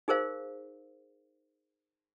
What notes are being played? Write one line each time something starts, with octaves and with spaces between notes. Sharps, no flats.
D#4 G#4 A#4 C5 F5